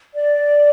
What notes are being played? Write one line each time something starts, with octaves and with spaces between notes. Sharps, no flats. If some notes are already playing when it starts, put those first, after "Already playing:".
D5